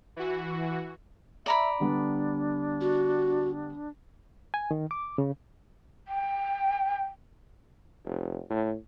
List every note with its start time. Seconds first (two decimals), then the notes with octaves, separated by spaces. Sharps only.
0.16 E3 F#4
1.46 D5 E5 A#5 B5
1.80 D3 G3 B3 D4
2.81 F#4
4.54 G#5
4.71 D#3
4.91 D6
5.18 C#3
6.07 G5
8.05 F1
8.50 A2